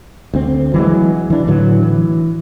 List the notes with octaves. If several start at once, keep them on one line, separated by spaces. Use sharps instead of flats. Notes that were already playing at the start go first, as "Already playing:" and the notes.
D2 C4
E3 F#3 G#3
E3 D4
A2 D3 E3 F#3
E3